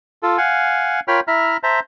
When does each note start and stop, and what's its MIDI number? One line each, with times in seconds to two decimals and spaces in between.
0.23 0.37 65
0.23 0.37 69
0.38 1.00 77
0.38 1.00 78
0.38 1.00 80
1.08 1.20 65
1.08 1.20 70
1.08 1.20 73
1.08 1.20 79
1.08 1.20 83
1.08 1.20 89
1.28 1.57 64
1.28 1.57 76
1.28 1.57 82
1.28 1.57 89
1.63 1.80 72
1.63 1.80 76
1.63 1.80 81
1.63 1.80 82